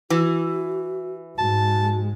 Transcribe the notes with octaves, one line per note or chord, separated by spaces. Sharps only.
E3 F#4
G#2 G#3 F#4 A5